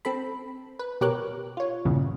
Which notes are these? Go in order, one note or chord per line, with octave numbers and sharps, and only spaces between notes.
C4 A4 B5
B4
B2 G4 A#4 C#5 D6 F#6
F4 C#5
B1 E2 G2 A#2 C#3 E3